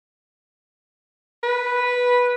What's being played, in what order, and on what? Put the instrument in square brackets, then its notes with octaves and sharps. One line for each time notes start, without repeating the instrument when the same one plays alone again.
[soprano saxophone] B4